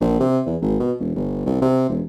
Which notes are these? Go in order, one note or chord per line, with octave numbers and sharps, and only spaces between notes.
A#1
C3
E2
G#1
B2
E1
G1
C2
C3
E1